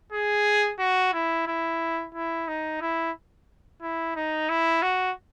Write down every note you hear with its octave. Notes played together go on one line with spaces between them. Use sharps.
G#4
F#4
E4
E4
E4
D#4
E4
E4
D#4
E4
F#4